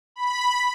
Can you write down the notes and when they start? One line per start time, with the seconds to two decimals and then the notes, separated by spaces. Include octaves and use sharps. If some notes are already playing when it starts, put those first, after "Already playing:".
0.16 B5